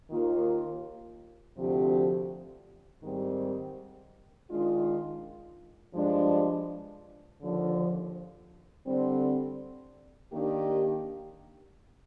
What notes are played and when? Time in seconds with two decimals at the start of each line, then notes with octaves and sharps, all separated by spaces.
0.10 D#2 D#3 A#3 F4
1.56 D2 C3 F3 C4 G4
3.03 G#2 D#3 G3 C4 G4
4.49 D#3 G#3 D4 F4
5.94 G2 F3 G#3 D4
7.41 D#2 D3 F3
8.86 D3 G3 C4
10.33 D#3 A#3 D4 G4